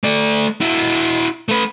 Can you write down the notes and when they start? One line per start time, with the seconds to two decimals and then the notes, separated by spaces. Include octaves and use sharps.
0.04 A3 D5
0.61 E4 F#4
1.49 A3 B4